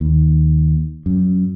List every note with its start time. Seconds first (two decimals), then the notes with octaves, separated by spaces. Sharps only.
0.01 D#2
1.06 F#2